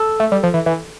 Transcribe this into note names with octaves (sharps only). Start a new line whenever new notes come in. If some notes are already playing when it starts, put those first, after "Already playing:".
Already playing: A4
A3
G3
F3
E3
E3